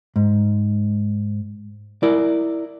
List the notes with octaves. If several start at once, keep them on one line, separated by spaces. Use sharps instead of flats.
G#2
E4 A#4 D5